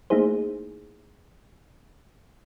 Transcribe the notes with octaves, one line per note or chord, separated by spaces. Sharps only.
A3 A#3 D#4 E4 G#4 C5